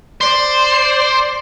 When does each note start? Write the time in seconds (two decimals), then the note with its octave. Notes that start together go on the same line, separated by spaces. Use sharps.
0.21 C5 D5